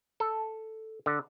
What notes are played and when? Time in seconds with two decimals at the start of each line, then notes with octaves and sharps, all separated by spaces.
0.20 A4
1.06 D3